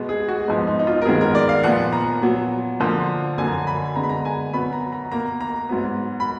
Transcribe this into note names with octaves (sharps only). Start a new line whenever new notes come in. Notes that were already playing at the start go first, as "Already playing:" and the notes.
Already playing: B2 G#3 B3
G#4
F#4
G#2 F3 B3 D#4
D#4
D#4
F4
A#4
G#2 D#3 F#3 B3 G#4
A#4
D5
F5
A#2 F3 B3 F#5
A#5
A#2 F#3 B3
D3 F3 A#3
F#2 D3 F#3 A#3 G#5
A#5
G#5
B5
D3 G#3 B3 A#5
B5
A#5
G#5
B2 F#3 B3 B5
A#5
A#5
B2 A#3 A#5
A#5
G#2 F#3 B3
B5